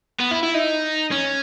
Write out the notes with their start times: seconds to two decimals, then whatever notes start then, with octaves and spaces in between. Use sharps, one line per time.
0.20 B3
0.31 E4
0.43 E4
0.54 D#4
1.11 C#4